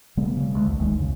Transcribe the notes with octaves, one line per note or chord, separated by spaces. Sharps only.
C#3 G3 A3 B3
C#3 G3
D2 G#3
B1 E2 A3
E1 C#2 D#3 G#3
C2 F2 C#3